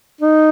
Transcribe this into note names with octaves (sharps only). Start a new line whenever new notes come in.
D#4